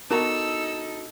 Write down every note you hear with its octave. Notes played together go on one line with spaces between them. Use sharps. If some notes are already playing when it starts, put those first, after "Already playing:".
B3 D4 D#4 F#4 A4 A#4 A#5 E6